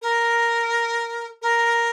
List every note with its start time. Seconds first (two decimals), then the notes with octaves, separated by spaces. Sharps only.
0.02 A#4
1.42 A#4